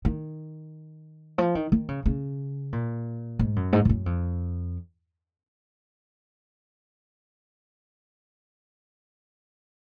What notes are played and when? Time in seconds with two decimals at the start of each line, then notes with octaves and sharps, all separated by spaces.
0.05 D#3
1.38 F3
1.55 D#3
1.72 D#3
1.88 C#3
2.06 C#3
2.72 A#2
3.39 G#2
3.56 F#2
3.73 G#2
3.85 F2
3.89 F#2
4.06 F2